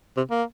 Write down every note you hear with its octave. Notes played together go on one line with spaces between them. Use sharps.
C3
A#3